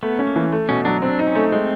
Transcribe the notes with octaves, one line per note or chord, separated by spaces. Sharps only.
A3 B3
C#4
A#3
E3
A3
B2 C#4
F#3 D4
C4 D4
D#4
C#4
A3
G#3 C4